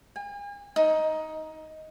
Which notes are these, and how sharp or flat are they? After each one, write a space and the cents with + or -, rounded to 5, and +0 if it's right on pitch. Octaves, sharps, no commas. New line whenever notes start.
G#5 -40
D#4 +10